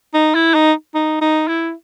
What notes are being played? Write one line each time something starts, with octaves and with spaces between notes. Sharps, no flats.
D#4
E4
D#4
D#4
D#4
E4